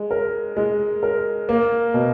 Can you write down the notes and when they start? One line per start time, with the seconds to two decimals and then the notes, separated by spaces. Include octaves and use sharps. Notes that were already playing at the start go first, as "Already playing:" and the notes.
Already playing: G#3
0.11 A#4
0.57 G#3
1.03 A#4
1.49 A#3
1.94 B2